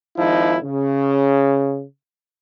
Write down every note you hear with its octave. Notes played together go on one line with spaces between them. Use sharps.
G#1 F3 D#4 E4
C#3